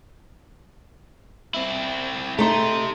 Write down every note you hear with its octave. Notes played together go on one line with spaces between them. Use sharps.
C4 E4
A3 D#4 G4 C6